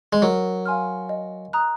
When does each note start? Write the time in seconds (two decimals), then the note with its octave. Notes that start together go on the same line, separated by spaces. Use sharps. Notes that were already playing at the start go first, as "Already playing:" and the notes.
0.13 G#3
0.22 F#3 A#4
0.65 F5 G#5 C6 F6
1.09 D#5
1.53 A#5 D#6 F#6